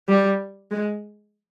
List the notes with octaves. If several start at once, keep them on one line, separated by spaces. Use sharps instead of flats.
G3
G#3